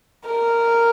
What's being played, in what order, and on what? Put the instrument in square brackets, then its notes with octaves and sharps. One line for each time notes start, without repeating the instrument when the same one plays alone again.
[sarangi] A#4